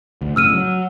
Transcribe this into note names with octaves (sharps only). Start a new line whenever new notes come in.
D2
F#2 A2 C#3 E6 F6 D#7
F#3